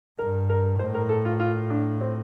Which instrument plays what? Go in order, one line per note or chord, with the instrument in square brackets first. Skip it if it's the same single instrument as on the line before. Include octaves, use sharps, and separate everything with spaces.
[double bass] G2 [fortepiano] A#4
[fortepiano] A#4
[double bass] A2 [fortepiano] C5
[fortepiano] A#4
A4
F4
F4
D4
C4